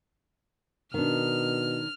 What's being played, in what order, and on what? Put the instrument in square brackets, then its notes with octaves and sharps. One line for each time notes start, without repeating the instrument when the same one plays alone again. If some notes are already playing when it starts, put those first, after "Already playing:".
[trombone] B2 [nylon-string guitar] D#3 D4 [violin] F6